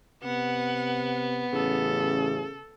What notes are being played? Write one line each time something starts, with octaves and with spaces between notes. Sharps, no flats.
C3 B3 F#5
A1 C#3 A4